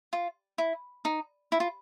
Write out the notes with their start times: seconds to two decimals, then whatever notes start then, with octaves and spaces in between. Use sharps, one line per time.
0.13 F4
0.58 E4
1.05 D#4
1.52 E4
1.60 F4